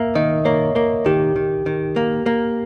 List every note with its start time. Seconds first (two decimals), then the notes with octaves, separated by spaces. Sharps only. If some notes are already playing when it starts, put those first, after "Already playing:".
Already playing: A#3 E5
0.15 D#3 D#5
0.45 A#3 C#5
0.75 A#3 A#4
1.06 D#3 G4
1.36 D#3
1.66 D#3
1.96 A#3
2.26 A#3